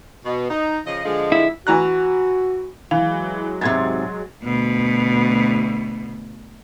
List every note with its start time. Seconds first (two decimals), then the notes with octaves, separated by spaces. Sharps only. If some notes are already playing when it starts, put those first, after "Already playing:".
0.25 B2
0.50 D#4
0.86 C#3 F3 D#5
1.05 D3 F3 G#3
1.32 E4
1.67 E3 F#4 A#5 F#6
2.91 E3 F#3 G#3 F5
3.61 G#2 C3 C6 G#6 A6
4.44 D2 B2